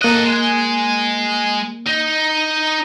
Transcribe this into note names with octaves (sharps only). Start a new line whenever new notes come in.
A#3 A4 D#5 F#6
G#3
D#4